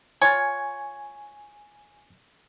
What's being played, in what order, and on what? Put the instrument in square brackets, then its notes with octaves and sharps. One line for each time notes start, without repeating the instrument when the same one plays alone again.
[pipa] F4 C#5 [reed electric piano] G#5